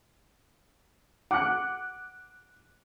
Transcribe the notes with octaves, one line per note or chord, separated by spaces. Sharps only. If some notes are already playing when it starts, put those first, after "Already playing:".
F#5 D6 F#6